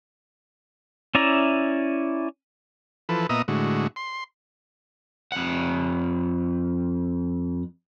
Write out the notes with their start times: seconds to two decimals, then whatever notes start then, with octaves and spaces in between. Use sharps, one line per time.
1.15 C#4 E4 D5 E5 A#5
3.09 E3 F3 A4 B4
3.29 A#2 B3 D#5 E5 A#5 D#6
3.48 A2 D3 G#3 F#4
3.96 C6
5.32 F2 F#5